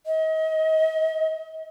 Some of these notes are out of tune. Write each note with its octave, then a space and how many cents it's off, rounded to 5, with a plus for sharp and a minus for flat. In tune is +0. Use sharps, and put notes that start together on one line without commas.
D#5 +35